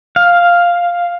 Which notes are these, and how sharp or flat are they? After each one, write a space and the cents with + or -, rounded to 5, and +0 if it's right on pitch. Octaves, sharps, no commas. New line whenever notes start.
F5 +0